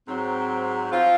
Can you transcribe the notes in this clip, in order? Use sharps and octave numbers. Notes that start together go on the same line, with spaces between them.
G#2 F#3 C4
F3 C4 F4